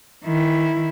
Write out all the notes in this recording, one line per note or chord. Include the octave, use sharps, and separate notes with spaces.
D#3 E4